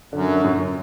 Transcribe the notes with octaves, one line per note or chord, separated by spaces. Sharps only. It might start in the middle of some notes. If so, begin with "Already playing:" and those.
F#2 D3
D3
F#2